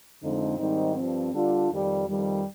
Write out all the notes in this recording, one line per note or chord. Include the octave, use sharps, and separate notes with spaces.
F2 D3 G#3 C4 D#4
G#2 D#3 G3 C4 D#4
G2 F3 C4
D3 G3 D4 F4
F2 D#3 G3
F2 D#3 G3